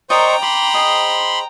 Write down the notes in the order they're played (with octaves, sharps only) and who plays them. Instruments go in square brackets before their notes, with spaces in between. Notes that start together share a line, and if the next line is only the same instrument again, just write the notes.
[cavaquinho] A#4 D5 D#5 [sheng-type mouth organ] C5 C#6 [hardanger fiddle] G5 A#5
[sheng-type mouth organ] B5 C6 [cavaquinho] D6
[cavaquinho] G#4 C5 D#5